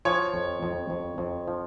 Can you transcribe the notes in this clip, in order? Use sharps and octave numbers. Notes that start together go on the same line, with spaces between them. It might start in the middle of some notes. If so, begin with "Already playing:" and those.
F3 C#5
F2
F2
F2
F2
F3